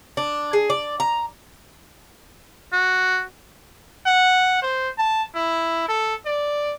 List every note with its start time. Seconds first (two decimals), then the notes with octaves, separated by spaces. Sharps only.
0.17 D4
0.53 G#4
0.70 D5
1.00 A#5
2.72 F#4
4.06 F#5
4.62 C5
4.98 A5
5.35 E4
5.88 A4
6.26 D5